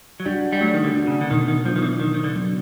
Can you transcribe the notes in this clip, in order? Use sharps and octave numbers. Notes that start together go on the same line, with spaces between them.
F#3
G3 D4 F#4
G3
F#3 A3
D#3
D3
D4 F#4
C#3
D3
B2 D#3
D#3
F3 F#3 B3 D4
D#3
E3
B2 D#3
D#3
D3
F#3 B3 D4